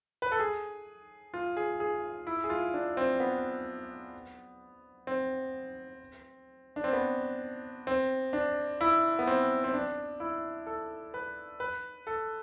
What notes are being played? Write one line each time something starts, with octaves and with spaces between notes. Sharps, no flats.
B4
A4
G#4
F4
G#4
G#4
E4
G#4
F4
D4
C4
B3
C4
D4
C4
B3
C4
D4
E4
B3
C4
C4
D4
E4
A4
B4
B4
A4